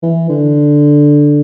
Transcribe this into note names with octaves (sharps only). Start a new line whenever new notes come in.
E3
D3